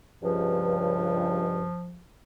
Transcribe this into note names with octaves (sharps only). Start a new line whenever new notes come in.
C#2 G2 F3